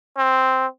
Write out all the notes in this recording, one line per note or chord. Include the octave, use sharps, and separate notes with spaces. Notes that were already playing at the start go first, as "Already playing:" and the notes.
C4